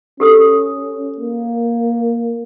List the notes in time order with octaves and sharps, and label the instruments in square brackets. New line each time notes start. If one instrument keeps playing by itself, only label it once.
[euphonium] C#4 [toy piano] G4 A4 D#6
[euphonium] A#3